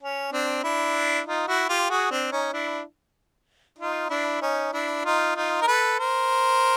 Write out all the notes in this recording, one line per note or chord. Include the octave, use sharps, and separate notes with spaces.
C#4
C4 D4
D4 E4
D#4 F4
E4 F#4
F4 G4
F#4 G#4
C4 D4
C#4 D#4
D4 E4
D#4 F4
D4 E4
C#4 D#4
D4 E4
D#4 F4
D#4 F4
A#4
A4 B4
A#4 C5